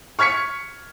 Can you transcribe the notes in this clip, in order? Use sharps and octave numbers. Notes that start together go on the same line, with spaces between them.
C#6 F6 G#6 B6 C#7